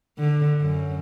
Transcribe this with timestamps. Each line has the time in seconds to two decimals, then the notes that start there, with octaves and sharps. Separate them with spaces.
0.19 D3
0.61 F#2